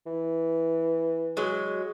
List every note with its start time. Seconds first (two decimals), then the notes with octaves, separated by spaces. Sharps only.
0.06 E3
1.37 F#3 G#3